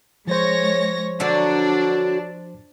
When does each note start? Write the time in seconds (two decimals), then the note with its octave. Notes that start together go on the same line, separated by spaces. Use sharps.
0.27 F3 G#3 C5 C#5 A#6
1.20 D3 F#3 D4 F#4